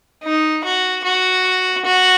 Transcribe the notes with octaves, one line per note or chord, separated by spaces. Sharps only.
D#4
F#4
F#4
F#4